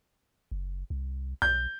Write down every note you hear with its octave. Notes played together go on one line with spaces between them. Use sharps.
F#1
C2
B1 G6